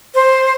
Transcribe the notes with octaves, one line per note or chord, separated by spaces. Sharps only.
C5